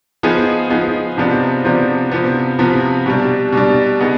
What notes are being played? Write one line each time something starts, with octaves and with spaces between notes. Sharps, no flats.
F3 B3 D#4 G#4
F3 B3 D#4 G#4
C3 F3 B3 D4
C3 F3 B3 D4
C3 F3 B3
C3 F3 B3
B2 G3 D4
B2 G3 D4
B2 B3 D#4 G#4